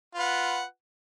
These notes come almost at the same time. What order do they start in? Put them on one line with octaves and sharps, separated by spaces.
F4 B4 F#5